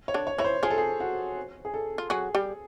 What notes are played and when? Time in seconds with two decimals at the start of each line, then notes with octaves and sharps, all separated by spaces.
0.08 C#5
0.14 D3 D4
0.27 C#5
0.38 E3 E4 C#5
0.44 C5
0.63 F3 F4 G#4
0.71 A4
0.78 G#4
1.00 F#4
1.65 G#4
1.74 A4
1.98 F4
2.10 F#3 F#4 G#4
2.35 G3 G4